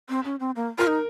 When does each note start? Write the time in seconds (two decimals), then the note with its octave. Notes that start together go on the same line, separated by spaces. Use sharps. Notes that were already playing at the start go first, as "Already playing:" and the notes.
0.09 C4
0.25 C#4
0.40 C4
0.56 A#3
0.78 F4 A#4
0.87 D#4